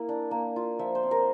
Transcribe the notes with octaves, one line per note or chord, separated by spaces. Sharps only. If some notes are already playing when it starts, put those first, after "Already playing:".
Already playing: A#3 E4
D4
A#3
F4
F3 E5
C5
C4
A#4